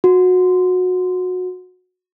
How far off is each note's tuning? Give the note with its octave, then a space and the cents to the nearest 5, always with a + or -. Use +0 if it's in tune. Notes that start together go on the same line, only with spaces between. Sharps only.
F#4 -20